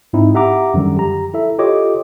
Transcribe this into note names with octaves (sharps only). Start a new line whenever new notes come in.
G#2 C4 D#4 E4
G4 E5 F#5 A#5 D6
F#2 D3 D#3 F3 G3
G4 A#5
E4 A4 E5
F4 G4 A4 C#5 D#5 D6